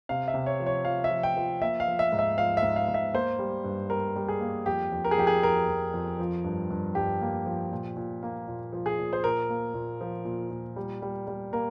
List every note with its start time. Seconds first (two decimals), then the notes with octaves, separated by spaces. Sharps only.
0.09 C3 F5
0.28 E5
0.34 C3
0.46 C#5
0.60 F3
0.66 C#5
0.85 F3 F5
1.04 E5
1.10 F3
1.23 G5
1.37 F3
1.61 A#3 E5
1.80 F5
1.87 F3
1.99 E5
2.12 G#2
2.19 E5
2.37 F3 F5
2.57 E5
2.63 G#2
2.76 F5
2.88 G#2
2.94 E5
3.14 A#3 C5
3.39 G3
3.64 G2
3.90 G3 A#4
4.16 G3
4.28 G#4
4.41 A#3
4.66 F2 G4
4.92 F2
5.05 A#4
5.11 G#4
5.18 F2 G4
5.27 G#4
5.43 F2 A#4
5.68 F2
5.94 F2
6.19 F3
6.44 G2
6.70 G2
6.95 G2 G4
7.21 A#3
7.46 F3
7.72 A#2
7.96 A#2
8.23 A#3
8.48 A#2
8.73 F3
8.86 G#4
8.99 A#2
9.13 C5
9.24 A#2 A#4
9.49 A#3
9.74 A#2
10.01 F3
10.25 A#2
10.51 A#2
10.76 G3
11.02 G3
11.28 G3
11.53 A#3 A#4